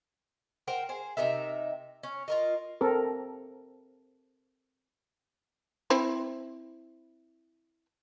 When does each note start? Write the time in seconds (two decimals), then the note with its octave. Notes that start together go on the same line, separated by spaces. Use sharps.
0.67 A#4 C5 F#5 G5
0.89 G#4 C5
1.17 C3 D#4 A#4 E5
2.03 C#4
2.28 F4 A#4 D#5
2.81 C4 A4 A#4
5.90 C4 E4 C5